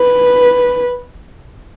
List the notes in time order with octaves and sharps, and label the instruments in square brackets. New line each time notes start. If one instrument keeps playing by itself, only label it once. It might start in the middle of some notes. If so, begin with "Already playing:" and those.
Already playing: [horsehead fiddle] B4